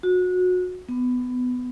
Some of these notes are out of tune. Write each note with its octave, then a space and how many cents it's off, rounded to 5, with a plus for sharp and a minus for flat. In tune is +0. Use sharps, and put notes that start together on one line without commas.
F#4 -25
B3 +15